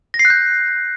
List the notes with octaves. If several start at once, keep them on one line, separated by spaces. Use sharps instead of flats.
A#6
C7
F#6
G6